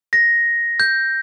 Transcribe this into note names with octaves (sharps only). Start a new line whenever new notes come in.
A#6
G6